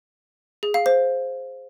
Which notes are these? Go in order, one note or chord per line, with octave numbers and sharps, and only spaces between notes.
G#4
F5
C5